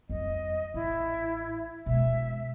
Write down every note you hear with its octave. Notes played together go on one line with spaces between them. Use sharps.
F2 G3 D#5
A1 E4
B2 G#3 E5